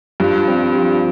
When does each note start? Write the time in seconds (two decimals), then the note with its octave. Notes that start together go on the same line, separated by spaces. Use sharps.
0.20 G2 F3
0.48 C4
0.77 F3